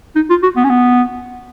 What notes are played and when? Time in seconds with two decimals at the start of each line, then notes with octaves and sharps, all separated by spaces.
0.16 D#4
0.30 F4
0.43 F#4
0.56 B3
0.64 C#4
0.70 B3